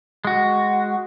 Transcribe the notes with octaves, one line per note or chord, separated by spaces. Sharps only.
G#3 F#4